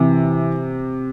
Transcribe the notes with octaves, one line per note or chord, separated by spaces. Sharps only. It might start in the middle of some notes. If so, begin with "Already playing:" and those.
Already playing: C3 E3